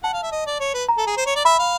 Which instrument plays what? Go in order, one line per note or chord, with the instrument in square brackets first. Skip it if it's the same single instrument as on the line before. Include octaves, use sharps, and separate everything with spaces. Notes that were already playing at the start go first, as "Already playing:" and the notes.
[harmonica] F#5 [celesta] A5
[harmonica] F5
E5
D#5
D5
C#5
B4
[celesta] A#5
[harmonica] A4
G#4
C5
C#5
D5
[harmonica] E5 [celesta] B5
[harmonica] F5